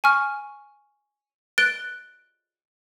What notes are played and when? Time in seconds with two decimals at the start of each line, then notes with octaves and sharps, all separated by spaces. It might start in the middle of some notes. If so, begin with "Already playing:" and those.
0.04 G#5 C#6 F6
1.58 F#6 A6 D7 G7